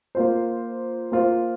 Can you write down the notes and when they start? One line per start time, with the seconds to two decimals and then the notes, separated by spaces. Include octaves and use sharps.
0.15 A#3 F4 C5
1.12 A#3 F4 C5